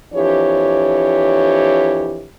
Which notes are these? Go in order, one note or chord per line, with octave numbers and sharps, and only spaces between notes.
F2 E3 D4 G4 C#5